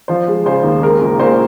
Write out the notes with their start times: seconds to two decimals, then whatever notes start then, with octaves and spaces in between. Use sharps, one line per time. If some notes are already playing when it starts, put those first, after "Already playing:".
0.08 F3 C5
0.28 G#3
0.45 C#3 C5
0.63 D#2
0.82 G#3 A#4
1.02 A#1
1.20 A#2 C5